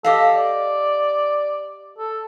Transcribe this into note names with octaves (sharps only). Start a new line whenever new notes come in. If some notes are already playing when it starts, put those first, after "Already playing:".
G4 A4 D#5 F5
D5
A4